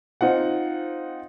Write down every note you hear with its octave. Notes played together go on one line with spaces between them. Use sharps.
C4 D#4 F4 F#5